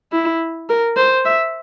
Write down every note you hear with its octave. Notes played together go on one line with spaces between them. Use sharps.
E4
A#4
C5
E5